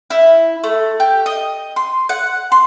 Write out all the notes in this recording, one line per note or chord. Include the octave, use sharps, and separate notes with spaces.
E4
A3
G4
D#5
C6
F#5
C6